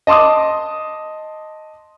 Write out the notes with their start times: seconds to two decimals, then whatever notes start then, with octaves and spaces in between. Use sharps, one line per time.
0.07 D#5 A5 C6 D6 D#6